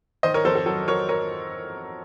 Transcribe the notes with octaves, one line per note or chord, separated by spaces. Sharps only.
D#3 C5 D#5
A#4 C#5
F2 A4 C5
A4
F#3 A4
F#3 A#4 C#5
A#4 C#5